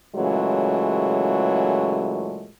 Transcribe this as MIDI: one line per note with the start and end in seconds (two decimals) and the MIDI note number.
0.15 2.48 46
0.15 2.48 49
0.15 2.48 52
0.15 2.48 54
0.15 2.48 56
0.15 2.48 57